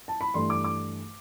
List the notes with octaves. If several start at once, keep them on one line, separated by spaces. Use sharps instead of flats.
A5
B5
G2 E3 A3 C6
D6
D6